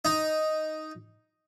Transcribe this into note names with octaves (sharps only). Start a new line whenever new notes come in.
D#4